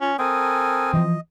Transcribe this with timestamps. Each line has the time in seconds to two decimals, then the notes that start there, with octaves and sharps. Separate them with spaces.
0.01 C#4 F4
0.19 C4 A4 A#4 G#5 D#6
0.94 E3 F3 D#5